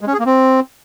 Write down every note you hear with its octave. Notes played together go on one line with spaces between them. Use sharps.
G#3
C#4
G#4
A#3
C4